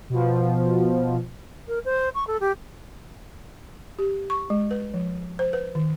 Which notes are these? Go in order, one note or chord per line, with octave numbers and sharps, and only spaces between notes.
B2 F3
A#4
C5
C#6
A4
G4
G4
C#6
G#3
B4
F3
C5
B4
D#3